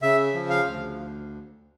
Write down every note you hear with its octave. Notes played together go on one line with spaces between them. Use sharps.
C#3 E5
F3
F5
D2